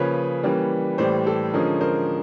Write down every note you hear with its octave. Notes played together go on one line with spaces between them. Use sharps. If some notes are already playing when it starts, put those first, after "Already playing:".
Already playing: C#3 F3 A#3 C#4 B4 C#5
E3 G3 A#3 C#4
A2 E3 G3 C5 D5
A4
D3 F3 G#3 C#4 G#4 A#4
A#4 C5